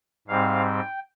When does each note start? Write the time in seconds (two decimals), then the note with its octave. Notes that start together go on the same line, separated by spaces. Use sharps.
0.28 G#2 G3 C4 F5
0.66 G5